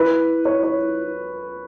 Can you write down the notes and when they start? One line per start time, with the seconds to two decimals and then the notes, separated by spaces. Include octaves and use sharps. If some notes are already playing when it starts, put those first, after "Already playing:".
Already playing: E4 B4
0.45 C#5
0.63 C#5